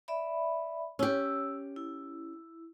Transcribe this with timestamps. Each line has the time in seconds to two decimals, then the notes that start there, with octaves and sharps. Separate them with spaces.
0.08 D5 E5 B5
0.99 C#4 G4 E6
1.76 E4